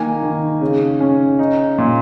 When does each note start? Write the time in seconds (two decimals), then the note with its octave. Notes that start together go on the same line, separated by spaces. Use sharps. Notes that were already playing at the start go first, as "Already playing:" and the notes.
Already playing: D#3 A#3 G#5
0.23 D#3
0.61 C#3
1.00 C#4
1.39 D#4
1.78 A#2